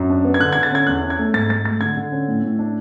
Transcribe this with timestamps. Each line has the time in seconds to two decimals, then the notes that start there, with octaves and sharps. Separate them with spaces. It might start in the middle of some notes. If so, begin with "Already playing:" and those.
Already playing: F#2
0.10 D4
0.25 B3
0.34 G#6
0.40 D3 F#6
0.53 D3 G#6
0.63 A6
0.72 C#4 G#6
0.87 E2 F#6
1.02 C#4
1.10 G#6
1.19 A3
1.34 G#2 A6
1.49 G#2 A6
1.65 A3 A6
1.80 D3 G#6
1.97 D3
2.12 C#4
2.28 A2
2.44 A2
2.59 D4